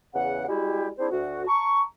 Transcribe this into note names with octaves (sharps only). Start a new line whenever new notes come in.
E2 C#3 F#5
G3 G#3 E4 F#4 G4
C4 D4 E4 G#4 C5
D2 F#4
A5 A#5 C#6